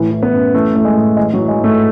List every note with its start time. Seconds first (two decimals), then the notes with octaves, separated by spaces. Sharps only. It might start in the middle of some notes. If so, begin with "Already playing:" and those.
Already playing: A2 E3
0.11 E3
0.23 B3
0.33 F#2
0.54 E3 A3
0.75 E3 A3
0.85 G#3
0.96 A2
1.17 E3 G#3
1.33 F#3
1.38 E3
1.48 G#3
1.59 G#2 A3